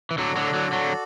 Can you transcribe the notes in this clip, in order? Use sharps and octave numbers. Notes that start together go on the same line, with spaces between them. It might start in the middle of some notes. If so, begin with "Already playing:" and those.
E3
D3 F#3 F#4 A4 D5
D3 F#3
D3 F#3
D3 F#3